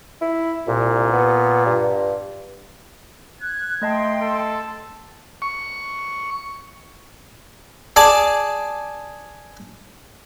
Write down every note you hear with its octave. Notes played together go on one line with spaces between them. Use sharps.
E4
C2 A#2
B3
G2
F#6 G#6
A3 D#5 G5 A5 C6
A4
C#6
G#4 D5 A5